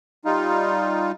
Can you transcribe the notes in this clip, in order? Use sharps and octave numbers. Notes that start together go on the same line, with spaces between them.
G3 D#4 F4